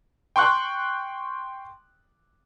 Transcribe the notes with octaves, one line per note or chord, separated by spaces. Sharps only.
G5 C6 C#6 F#6